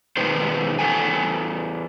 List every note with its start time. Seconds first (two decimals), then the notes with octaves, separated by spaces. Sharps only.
0.17 B2 D#3 G#3 B3 C5
0.79 E2 A4 F#5 G#5